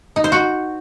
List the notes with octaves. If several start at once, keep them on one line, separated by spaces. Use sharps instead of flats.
D#4
C5
F#4